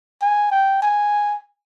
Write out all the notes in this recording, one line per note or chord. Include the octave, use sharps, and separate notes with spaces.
G#5
G5
G#5